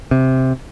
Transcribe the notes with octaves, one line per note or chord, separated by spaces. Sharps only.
C3